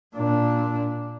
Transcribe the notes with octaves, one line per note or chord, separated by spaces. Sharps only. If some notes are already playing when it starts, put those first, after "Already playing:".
A#2 D4